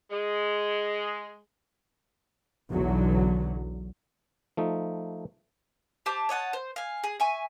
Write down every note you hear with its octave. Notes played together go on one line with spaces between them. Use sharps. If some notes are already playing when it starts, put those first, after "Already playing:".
G#3
B1 E2 D3 F#3
F3 A3 D#4
G4 C5 A5 D6
C#5 D#5 F#5 A5
C5
F5 G#5
G#4
E5 G#5 C#6